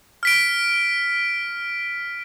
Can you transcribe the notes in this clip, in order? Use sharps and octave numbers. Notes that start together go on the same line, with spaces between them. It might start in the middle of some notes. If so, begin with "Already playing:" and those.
F6 B6 D7